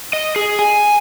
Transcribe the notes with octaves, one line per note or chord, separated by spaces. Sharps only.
D#5
G#4
G#5